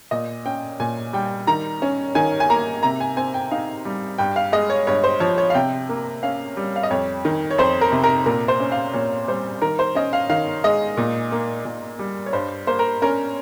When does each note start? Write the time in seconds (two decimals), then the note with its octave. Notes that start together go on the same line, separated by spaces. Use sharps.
0.11 A#2 D#5
0.45 C#4 G5
0.80 A#2 G#5
1.13 G3 G5
1.47 D#3 A#5
1.82 C#4
2.15 D#3 G#5
2.40 G#5
2.50 A#3 A#5
2.83 C3 A#5
3.00 G#5
3.17 C4 G#5
3.34 G5
3.51 D#4 F5
3.85 G3
4.18 G2 G5
4.36 F5
4.52 G#3 D#5
4.70 C#5
4.87 G2 C#5
5.04 C5
5.20 F3 C#5
5.38 C#5
5.50 F5
5.54 C3 G5
5.89 A#3
6.23 C#4 F5
6.57 G3
6.76 F5
6.83 D#5
6.90 F2 C#5
7.25 D#3
7.51 C#5
7.58 F2 C5
7.81 A#4
7.92 C3
8.04 A#4
8.26 A#2 A#4
8.48 C5
8.60 C#4
8.72 F5
8.94 A#2 C#5
9.28 G3 C5
9.62 D#3 A#4
9.79 C5
9.95 C#4 D#5
10.13 F5
10.30 D#3 F5
10.64 G#3 D#5
10.97 A#2
11.32 A#3
11.65 A#2
11.99 G3
12.26 C#5
12.33 G2 C5
12.67 A#3 C5
12.79 A#4
13.02 C#4 A#4